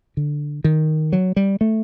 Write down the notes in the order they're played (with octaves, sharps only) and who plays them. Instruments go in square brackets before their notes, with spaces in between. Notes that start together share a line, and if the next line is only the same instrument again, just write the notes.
[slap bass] D3
D#3
F#3
G3
A3